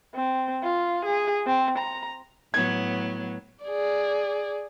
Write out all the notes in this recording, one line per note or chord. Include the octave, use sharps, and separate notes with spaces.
C4
F4
G#4
C4
A#5
A2 F#3 B3 G#6
G#4 D5